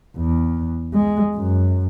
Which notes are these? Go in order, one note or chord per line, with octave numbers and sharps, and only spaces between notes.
E2
G#3
F#2